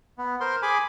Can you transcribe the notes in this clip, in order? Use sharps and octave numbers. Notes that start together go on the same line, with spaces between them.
B3
A#4 C5 C6
G#4 G#5 B5 D6